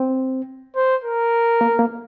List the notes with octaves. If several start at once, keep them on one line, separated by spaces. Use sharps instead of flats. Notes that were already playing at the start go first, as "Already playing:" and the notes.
Already playing: C4
C5
A#4
A#3
A#3